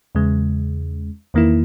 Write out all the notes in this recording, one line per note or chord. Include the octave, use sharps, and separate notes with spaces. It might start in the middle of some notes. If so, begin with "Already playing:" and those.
E2 C#3 G#3
E2 D#3 A#3 E4